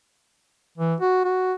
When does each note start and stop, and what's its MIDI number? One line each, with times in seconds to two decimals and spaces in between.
0.78 0.95 52
1.01 1.24 66
1.24 1.53 66